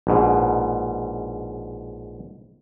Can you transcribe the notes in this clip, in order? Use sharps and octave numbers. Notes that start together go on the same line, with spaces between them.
A#1 G#2 B2